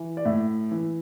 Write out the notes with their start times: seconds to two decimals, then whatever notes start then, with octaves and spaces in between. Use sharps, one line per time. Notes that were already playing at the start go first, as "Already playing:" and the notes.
Already playing: E3
0.17 D5
0.25 A2 E5
0.71 E3